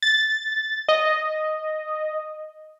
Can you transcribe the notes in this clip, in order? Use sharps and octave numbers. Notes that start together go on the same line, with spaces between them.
A6
D#5